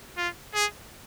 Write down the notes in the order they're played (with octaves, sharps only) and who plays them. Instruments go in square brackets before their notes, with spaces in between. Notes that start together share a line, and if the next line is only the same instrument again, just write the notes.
[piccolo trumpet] F4
G#4